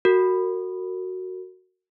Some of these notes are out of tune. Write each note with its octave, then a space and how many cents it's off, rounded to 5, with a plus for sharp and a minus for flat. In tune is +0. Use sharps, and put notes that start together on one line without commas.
F#4 +0 A#4 -30